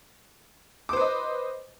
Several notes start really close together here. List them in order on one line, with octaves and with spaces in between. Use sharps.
D6 C5 B4 D#5